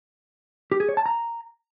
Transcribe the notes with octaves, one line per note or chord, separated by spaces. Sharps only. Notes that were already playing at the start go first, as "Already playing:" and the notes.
G4
G#4
C#5
A5
A#5